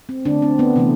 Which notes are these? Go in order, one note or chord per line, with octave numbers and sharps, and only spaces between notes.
C4
D3 A3 D4
C4
B3
C3 E3 A3